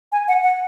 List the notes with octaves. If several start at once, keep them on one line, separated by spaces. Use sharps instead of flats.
G#5
F#5
F#5